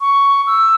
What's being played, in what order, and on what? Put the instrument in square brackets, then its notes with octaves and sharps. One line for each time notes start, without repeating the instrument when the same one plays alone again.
[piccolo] C#6
E6